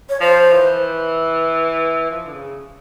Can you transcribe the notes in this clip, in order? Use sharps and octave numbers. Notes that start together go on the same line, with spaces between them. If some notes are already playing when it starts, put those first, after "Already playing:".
C#5
F3 C5
E3
F3
D3
C#3